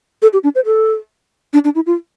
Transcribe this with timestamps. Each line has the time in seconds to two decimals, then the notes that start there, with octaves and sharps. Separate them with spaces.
0.22 A4
0.33 G4
0.44 D4
0.55 C5
0.66 A4
1.53 D4
1.64 D4
1.75 E4
1.86 F4